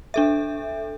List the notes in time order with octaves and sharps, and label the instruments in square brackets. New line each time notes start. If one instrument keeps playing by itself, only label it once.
[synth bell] D4 A4 E5